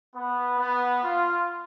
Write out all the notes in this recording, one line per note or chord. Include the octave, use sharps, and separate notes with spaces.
B3
B3
F4